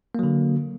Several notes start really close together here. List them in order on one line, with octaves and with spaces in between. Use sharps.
A#3 F#3 D3